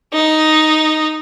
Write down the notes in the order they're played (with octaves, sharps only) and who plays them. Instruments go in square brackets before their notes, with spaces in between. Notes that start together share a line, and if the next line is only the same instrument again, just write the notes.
[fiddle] D#4